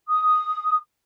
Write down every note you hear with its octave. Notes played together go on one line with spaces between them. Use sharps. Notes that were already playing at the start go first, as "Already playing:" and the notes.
D#6